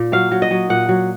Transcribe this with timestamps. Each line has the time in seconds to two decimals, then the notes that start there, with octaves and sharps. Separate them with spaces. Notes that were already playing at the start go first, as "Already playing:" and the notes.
Already playing: A#2
0.12 F#3 F5
0.31 F#3
0.42 D#5
0.51 F#3
0.70 A#2 F#5
0.89 F#3